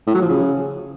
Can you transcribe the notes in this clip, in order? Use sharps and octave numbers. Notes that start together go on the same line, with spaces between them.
A2
F#3
F3
C#3